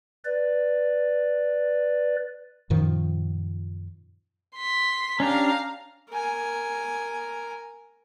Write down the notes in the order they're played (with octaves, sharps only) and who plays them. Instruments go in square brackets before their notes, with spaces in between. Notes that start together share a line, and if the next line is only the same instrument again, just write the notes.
[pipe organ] B4 D5
[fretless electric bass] F#2 A#2 D#3 F3
[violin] C6 B6
[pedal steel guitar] C#4 D4 G4 [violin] F5 A#5
[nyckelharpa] A#4 G#5